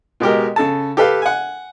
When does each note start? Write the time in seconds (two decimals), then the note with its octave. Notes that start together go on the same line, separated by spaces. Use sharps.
0.20 B2 G#3 G4 A#4
0.56 C#3 A4 A5
0.97 G4 A4 B4 F5
1.22 F#5 G#5